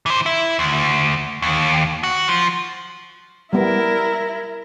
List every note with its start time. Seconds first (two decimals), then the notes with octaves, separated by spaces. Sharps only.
0.06 E3 C5
0.26 E4
0.59 D2
1.42 D#2
2.03 F#4
2.28 F3
3.53 G3 B3 E4 A#4